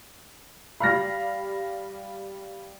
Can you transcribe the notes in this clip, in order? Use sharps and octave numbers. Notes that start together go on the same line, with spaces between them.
G3 F5 B5 F6 A#6